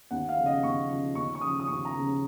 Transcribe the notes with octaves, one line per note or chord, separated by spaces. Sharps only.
D#2 F#5
F5
C#3 F3
D#5
D#2 C#6
C#3 F3
D#2 C#6
C#6
C#3 F3 D#6
D#6
D#2 C#6
A#5
C#3 F3